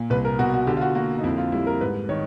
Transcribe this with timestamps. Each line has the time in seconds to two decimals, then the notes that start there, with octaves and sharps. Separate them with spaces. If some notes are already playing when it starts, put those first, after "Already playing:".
Already playing: A#2
0.10 C2 B4
0.25 A#4
0.39 B2 F#4
0.54 F#4
0.67 D3 G4
0.77 F4
0.81 F#4
0.95 A#3 F#4
1.18 D#4
1.24 F2 E4
1.38 F4
1.52 G3 E4
1.67 A#4
1.81 G#2 B4
2.09 D#3 C#5